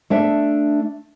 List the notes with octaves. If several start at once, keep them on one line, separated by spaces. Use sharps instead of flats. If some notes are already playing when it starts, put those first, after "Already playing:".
A3 D4 E5